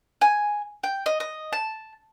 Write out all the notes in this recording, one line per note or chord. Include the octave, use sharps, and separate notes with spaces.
G#5
G5
D#5
D#5
A5